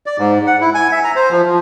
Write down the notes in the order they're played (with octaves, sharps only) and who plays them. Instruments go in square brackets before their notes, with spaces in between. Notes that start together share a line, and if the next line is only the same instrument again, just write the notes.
[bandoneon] D5
G#2
F#5
E4
G#5
E5
A#5
C5
F3
F3